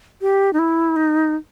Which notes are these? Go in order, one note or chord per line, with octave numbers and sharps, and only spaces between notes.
G4
D#4
E4
D#4